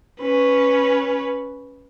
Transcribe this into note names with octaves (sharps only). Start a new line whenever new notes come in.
C#4 B4